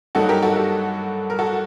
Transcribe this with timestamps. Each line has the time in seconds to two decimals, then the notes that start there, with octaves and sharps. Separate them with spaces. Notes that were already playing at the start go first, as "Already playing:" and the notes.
0.15 G2 D#3 F#3 A#3 D#4 F#4 A4
0.29 G4 A#4
0.42 F#4 A4
0.56 F#4 A4
1.30 A#4
1.39 F#4 A4